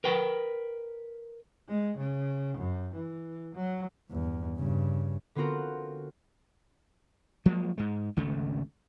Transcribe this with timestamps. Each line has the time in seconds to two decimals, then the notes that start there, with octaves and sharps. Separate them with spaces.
0.04 A#4 B4 G5
1.68 G#3
1.98 C#3
2.58 F#2
2.94 E3
3.55 F#3
4.10 E2 G2
4.57 G2 C#3
5.35 D3 B3 C4 F4 F#4 A#4
7.46 F3 F#3 G#3 A#3
7.78 G#2 G#3
8.17 G#1 D2 C#3 A3